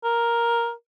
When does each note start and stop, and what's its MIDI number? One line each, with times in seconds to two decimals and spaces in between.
0.04 0.72 70